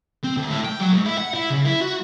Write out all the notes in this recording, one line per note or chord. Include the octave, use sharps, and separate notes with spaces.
C4
D2
A2
G5
F#3
G#2
E4
F#5
E4
C#3
E4
F#4